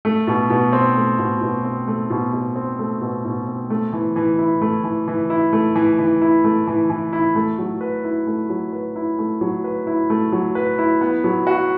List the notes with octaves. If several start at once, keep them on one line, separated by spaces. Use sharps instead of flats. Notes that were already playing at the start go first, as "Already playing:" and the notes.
A3
B2
B2
C4
A3
B2
B2
C4
A3
B2
B2
C4
A3
B2
B2
C4
A3
E3
E3
E4
A3
E3
E3
E4
A3
E3
E3
E4
A3
E3
E3
E4
A3
F#3
B4
E4
A3
F#3
B4
E4
A3
F#3
B4
E4
A3
F#3
B4
E4
B3
F#3
F#4